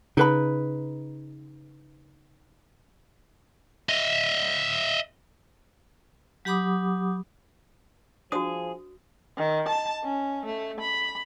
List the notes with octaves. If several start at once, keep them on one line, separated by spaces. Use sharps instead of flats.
C#3 D#4 B4 B5
D#5 E5
F#3 G4 F#5 B5 D6 D#6
F3 D4 F#4 G#4 C5 D#6
D#3
A5
C#4
A3
B5